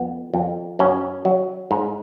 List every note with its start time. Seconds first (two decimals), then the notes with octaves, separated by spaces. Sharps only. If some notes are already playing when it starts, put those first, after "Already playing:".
Already playing: F2 B3
0.34 F2
0.79 F#2 C#4
1.25 F#3
1.71 G#2